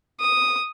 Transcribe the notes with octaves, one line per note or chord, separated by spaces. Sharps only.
D#6